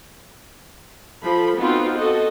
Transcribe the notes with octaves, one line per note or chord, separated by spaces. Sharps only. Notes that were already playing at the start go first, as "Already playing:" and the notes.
F3 A4 B5
B3 C4 D#4 F4 F#4 B4
F#4 A4 D#5